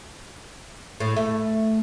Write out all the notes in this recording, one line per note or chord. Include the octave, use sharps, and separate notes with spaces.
A2
A3